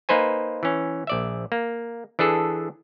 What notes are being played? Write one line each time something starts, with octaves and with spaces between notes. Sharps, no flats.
A#3 D#4 B4 C5 G#5
E3 C#4
A#1 D5 E5
A#3
E3 D4 G#4 A4